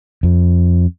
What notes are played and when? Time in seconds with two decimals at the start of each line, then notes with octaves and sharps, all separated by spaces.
0.23 F2